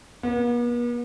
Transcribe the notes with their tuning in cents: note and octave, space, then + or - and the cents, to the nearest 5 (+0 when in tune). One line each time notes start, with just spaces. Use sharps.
B3 -45